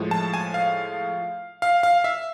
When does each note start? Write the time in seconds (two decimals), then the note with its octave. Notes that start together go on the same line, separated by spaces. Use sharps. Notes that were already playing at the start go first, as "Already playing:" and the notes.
Already playing: A2 F3 G#3
0.11 A5
0.34 G#5
0.54 F5
1.62 F5
1.83 F5
2.04 E5